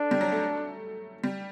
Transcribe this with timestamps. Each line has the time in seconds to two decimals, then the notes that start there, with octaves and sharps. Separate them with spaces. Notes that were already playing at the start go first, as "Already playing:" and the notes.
Already playing: D4 A4
0.11 G3
0.21 F#3
0.32 A3
1.24 G3